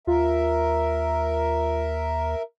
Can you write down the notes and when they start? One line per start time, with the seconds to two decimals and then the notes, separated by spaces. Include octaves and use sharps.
0.07 D#2 F4 A#4 E5